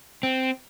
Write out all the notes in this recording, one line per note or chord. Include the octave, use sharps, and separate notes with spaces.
C4